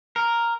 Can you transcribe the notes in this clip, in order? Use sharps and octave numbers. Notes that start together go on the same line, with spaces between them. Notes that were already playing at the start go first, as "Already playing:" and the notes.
A#4